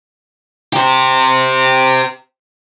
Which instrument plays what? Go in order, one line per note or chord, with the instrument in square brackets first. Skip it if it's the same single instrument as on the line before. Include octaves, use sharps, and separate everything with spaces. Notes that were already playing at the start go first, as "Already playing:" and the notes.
[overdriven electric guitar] G4 C5